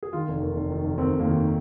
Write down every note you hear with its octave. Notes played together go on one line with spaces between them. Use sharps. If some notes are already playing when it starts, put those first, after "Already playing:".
G#4
D#3 F4
F1
D#2
F1
D#3
F1
D#2 C4
F1
A#3
D#3